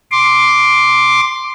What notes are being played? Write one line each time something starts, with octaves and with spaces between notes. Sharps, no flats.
C6 D6